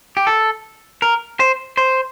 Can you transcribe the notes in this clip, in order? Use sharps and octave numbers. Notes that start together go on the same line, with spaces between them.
G4
A4
A#4
C5
C5